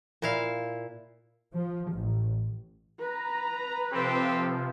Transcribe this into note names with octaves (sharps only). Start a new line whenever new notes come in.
A#2 E4 F5
F3
A1
B4 A#5
C3 F3 C4 G4 A4